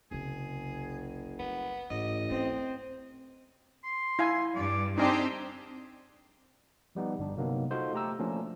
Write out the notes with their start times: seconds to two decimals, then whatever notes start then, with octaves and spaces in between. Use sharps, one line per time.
0.11 F#1 C2 C#3 G#4
1.39 G3 B3
1.91 A1 G#2 D#5
2.31 C4 C#4
3.84 C6
4.19 E4 F5 G#5
4.55 G2 D5
4.98 C4 D4 D#4 G4 G#4 C5
6.95 F3 G3 B3 D#4
7.19 G1 G3 D4
7.36 C3 F#3 A#3 B3 D#4
7.71 D#4 F4 F#4 A4 C5 D#5
7.93 A3 G4 A#5 E6
8.19 F3 A3 A#3 C#4 D4